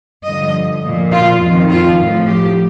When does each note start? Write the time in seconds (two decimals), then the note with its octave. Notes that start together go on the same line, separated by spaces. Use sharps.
0.25 G2 D3 F3 D#5
0.83 A#2 F3
1.11 F4
1.41 F2 D#3
1.69 F4
1.98 A2 F3
2.28 G4